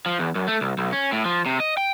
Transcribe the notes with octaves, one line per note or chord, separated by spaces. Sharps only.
F3
E2
F#2
A3
C2
B1
C#4
A2
F3
C3
D#5
G5